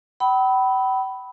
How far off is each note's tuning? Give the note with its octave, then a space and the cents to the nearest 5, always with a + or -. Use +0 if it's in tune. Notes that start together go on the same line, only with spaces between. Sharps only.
G5 -45 B5 +0 E6 -40